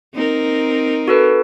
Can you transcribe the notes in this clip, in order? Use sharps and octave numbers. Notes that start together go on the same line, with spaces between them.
C4 D#4 A#4
F#4 A4 B4